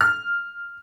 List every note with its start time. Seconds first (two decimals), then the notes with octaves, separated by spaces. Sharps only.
0.01 F6